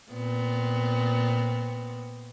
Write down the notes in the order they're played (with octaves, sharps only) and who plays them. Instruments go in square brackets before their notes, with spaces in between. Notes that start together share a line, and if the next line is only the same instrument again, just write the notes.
[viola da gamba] A#2 B3 C4